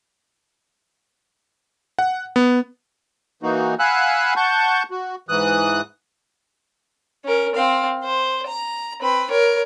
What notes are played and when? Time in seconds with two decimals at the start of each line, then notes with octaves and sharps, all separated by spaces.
1.99 F#5
2.36 B3
3.43 E3 A#3 D#4 F#4
3.79 F5 F#5 G#5 B5 E6 F#6
4.36 F#5 A5 C#6 G6
4.91 F#4
5.29 G#2 E3 D#6 F#6
7.25 C#4 A#4
7.55 C4 F5
8.04 C5
8.47 A#5
9.01 C4 B4
9.30 A#4 C#5